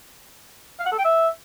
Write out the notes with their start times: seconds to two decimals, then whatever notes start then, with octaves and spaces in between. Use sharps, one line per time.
0.79 F5
0.86 F#5
0.92 A4
0.98 G5
1.05 E5